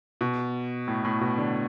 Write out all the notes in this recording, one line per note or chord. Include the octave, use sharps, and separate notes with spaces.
B2
A2
A2
B2
D3